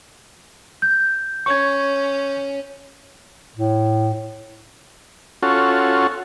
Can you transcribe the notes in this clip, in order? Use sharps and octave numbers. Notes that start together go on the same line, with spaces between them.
G6
C#4 C#6 G#6
A2
C#4 F4 F#4 A4